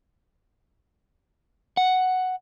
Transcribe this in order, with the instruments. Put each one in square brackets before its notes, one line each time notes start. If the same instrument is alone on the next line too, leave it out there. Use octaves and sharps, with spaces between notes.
[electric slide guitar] F#5